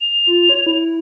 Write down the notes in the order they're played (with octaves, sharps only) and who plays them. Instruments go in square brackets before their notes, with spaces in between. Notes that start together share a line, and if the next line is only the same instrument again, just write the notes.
[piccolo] F7
[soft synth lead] F4
C#5
E4